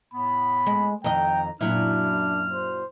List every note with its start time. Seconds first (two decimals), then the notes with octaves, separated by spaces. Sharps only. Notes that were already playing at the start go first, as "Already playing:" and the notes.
0.14 A2 B3 B5
0.66 G#3
1.04 F2 D#3 D#5 G5 A#5
1.61 F#2 A#2 F#3 D4 E4 F6
2.52 C5